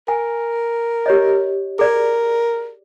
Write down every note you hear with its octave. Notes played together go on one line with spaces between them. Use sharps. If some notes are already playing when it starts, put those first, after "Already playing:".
A#4 G#5
G4 C#5 D#5
G#4 A#4 D5